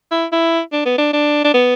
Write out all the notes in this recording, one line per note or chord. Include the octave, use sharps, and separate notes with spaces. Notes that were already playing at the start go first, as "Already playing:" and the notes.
E4
E4
D4
B3
D4
D4
D4
B3